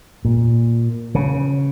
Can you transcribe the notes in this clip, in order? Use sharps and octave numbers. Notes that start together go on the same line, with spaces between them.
A#2
C#3